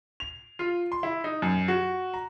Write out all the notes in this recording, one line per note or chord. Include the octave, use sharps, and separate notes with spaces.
F7
F4
C6
E4
D#4
F#2
F#4
A#5